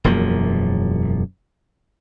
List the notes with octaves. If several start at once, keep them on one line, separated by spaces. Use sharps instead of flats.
E1 F#2 F3 A#3